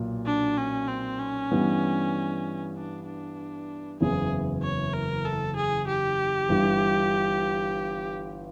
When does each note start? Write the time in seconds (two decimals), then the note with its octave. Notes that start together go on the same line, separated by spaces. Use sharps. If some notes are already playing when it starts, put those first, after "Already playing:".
Already playing: B1 A#2
0.26 D4
0.58 C#4
0.88 C4
1.20 C#4
1.51 G2 E3 G3 B3
2.76 D4
3.07 D4
4.00 F#1 E2 C#3 E3 G#4
4.63 C#5
4.93 A#4
5.25 A4
5.56 G#4
5.88 G4
6.49 G1 G2 E3